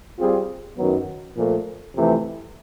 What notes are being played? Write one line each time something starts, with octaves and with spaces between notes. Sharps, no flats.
G3 C4 F4 G#4
F#2 D#3 F#3 B3
A#2 F3 A3
F2 C3 E3 A3